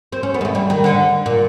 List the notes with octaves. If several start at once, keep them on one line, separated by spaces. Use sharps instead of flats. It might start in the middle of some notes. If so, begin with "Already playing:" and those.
C4
C#4
B3
G#3
A3
G3
D#3
D3
A#2